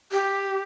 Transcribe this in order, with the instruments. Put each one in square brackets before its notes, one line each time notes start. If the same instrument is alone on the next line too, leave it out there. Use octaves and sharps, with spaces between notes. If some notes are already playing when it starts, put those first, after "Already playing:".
[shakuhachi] G4